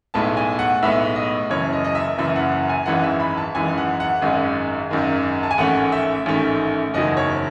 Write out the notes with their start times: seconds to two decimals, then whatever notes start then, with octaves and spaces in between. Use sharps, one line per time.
0.14 B1 A2 G#3 B3 A5
0.37 G#5
0.59 F#5
0.83 B1 A2 G#3 B3 E5
1.16 D#5
1.50 F#1 F#2 E3 C#5
1.73 D#5
1.84 D#5
1.95 E5
2.18 F#1 F#2 E3 E5
2.36 F#5
2.52 F#5
2.69 G#5
2.86 G#1 F#2 E3 G#3 F#5
3.04 E5
3.20 B5
3.37 A5
3.54 G#1 F#2 E3 G#3 G#5
3.77 F#5
4.00 F#5
4.22 G#1 F#2 D#3 G#3
4.90 G#1 F#2 D#3 G#3
5.43 A5
5.51 G#5
5.58 A1 G#2 D#3 A3 C#4 F#5
5.92 E5
6.26 A1 G#2 D#3 A3 C#4
6.94 F#1 E2 D#3 F#3 D#5
7.17 C#5